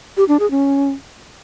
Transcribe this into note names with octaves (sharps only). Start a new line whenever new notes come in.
G4
D4
G#4
C#4